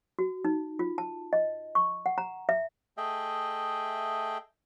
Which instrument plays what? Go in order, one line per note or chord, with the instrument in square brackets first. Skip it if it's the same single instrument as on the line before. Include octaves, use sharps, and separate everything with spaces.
[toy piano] F#4
D#4
F4
A5
D#5
C#6
F#5
A#5
E5
[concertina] A3 G#4 D#5 E5 G5